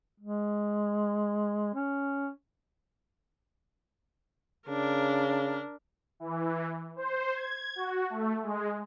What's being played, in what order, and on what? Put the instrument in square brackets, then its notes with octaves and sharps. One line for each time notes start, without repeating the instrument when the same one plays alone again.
[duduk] G#3
C#4
[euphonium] C#3 [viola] D4 A#4
[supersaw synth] E3
C5
G#6
F#4
A3
G#3